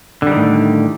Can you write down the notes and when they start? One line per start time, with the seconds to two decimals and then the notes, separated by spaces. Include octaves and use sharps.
0.22 D3
0.27 G3
0.31 D#3
0.36 A2